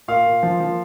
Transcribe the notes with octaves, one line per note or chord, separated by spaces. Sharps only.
A#2 F5
A#2
F3
F3